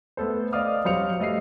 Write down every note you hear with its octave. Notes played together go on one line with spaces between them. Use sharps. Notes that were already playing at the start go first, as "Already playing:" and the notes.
A3 B3 A4 C5
D5 D#5 F5 D6 D#6 F6
G2 F#3 C5 F5 C#7 F7
G3 A3 D#5 F5 C7